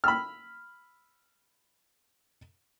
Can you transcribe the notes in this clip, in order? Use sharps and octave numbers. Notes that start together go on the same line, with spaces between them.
B5 E6 F6